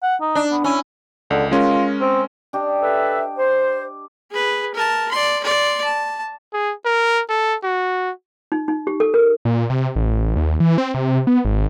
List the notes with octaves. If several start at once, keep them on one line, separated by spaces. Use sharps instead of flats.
F#5
D#4
D4
B3
C#4 E4
C#2 D3
G#3 C#4 F4 A#4
C4
D4 G4 D#5
A4 B4 E5
C5
G#4 B4
A#4 A5
D5 C6
D5 C6
A5
G#4
A#4
A4
F#4
D#4
D#4
G4
A4
A#4
A#2
C3
A1
D#2
E3
C4
C3
B3
G#1